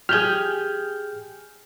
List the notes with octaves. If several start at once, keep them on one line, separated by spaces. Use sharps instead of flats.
G4 G#4 F6 G6